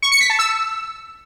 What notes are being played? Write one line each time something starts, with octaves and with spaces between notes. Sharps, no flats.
C#6
C#7
B6
A5
E6